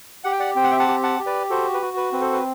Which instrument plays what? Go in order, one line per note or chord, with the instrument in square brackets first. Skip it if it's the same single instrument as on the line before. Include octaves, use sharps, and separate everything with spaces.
[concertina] G4 F#5
G5
D5 F#5
C4 G5
F#5
E5 G5
F#5 A5
G4
F#5 A5
G4
B4 D5
F#4 A4 C5
B4
F#4
B4
C4 B4
A4 C5
B4